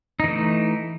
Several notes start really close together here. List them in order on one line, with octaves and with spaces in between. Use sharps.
D#4 E3 A3